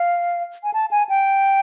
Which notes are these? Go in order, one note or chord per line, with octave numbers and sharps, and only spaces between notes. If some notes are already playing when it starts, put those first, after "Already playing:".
Already playing: F5
G#5
A5
G#5
G5